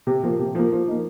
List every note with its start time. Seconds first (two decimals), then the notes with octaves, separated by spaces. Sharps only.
0.07 C3
0.23 F3 A#3
0.39 C3
0.55 F3 A#3
0.72 F3
0.88 A#3 D#4